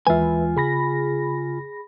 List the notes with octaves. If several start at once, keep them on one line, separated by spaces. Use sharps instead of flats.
D#2 E3 G#3 F4 B4 E5 G#5
C#3 G#4 B5 A#6